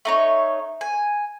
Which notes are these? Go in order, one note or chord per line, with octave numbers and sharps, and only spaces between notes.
A3 D#4 C#5
G#5